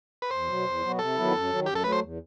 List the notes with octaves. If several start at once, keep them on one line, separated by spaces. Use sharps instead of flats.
B4
E2 C5
B2 F#3
E2
B2 F#3 B3 F#4
C3 A4
D#3 F#3 B3 E4
F#2
D#3 F#3
F#2 G4
A4
F#3 A3 B4
C5
E2